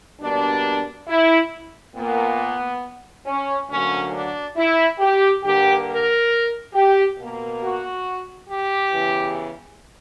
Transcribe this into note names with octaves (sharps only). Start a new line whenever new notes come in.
B2 G3 A#3 D4
E4
A#2 A#3 B3
C#4
D2 D3 F#3 A#3 C#4
D4
E4
G4
G2 D3 A#3 G4
A#4
G4
B2 A#3
F#4
G4
E2 C#3 E3